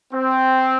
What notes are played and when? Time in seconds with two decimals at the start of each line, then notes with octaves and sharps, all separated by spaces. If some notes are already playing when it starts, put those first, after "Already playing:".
0.12 C4